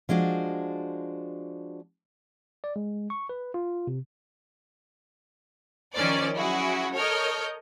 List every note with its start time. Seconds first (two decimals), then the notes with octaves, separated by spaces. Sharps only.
0.09 F3 G#3 D4 F#4
2.64 D5
2.76 G#3
3.10 C#6
3.29 B4
3.54 F4
3.87 C3
5.94 D#3 F3 C#4 A#4 C5 D5
6.36 F#3 C#4 E4 F#4 G#4
6.95 A4 A#4 C#5 D#5 F6 G6